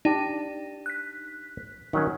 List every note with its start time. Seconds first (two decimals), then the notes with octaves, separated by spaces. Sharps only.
0.05 D4 D#4 G4
0.86 F#6 B6
1.93 D#3 F#3 C#4